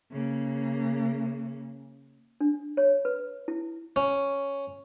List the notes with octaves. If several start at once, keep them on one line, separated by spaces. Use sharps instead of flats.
C#3 A#3
D4
C#5
B4
E4
C#4